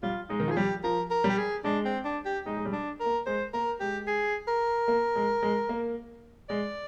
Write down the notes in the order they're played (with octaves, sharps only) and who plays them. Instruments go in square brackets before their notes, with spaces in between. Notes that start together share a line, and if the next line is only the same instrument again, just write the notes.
[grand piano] G3 [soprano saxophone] F4
[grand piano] G#3 [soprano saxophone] D#4
[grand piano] D#3
[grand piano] F3 [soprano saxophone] G#4
[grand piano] G3 [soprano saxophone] G4
[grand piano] F3 [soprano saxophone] A#4
[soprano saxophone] A#4
[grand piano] G3
[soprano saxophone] G4
G#4
[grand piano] G#3 [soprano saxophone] D4
[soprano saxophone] C4
D4
G4
[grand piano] G#3 [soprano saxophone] D#4
[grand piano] G#3
G3
[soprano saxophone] D4
A#4
[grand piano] A#3
[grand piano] G#3 [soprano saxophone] C5
[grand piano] A#3 [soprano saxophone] A#4
[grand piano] G#3 [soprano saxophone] G4
[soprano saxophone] G#4
A#4
[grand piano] A#3
G#3
G#3
A#3
[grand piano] G#3 [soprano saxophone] D5